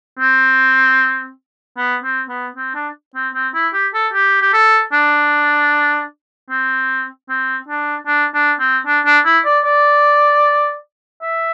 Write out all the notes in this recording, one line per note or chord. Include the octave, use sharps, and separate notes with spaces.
C4
B3
C4
B3
C4
D4
C4
C4
E4
G4
A4
G4
G4
A4
D4
C4
C4
D4
D4
D4
C4
D4
D4
E4
D5
D5
E5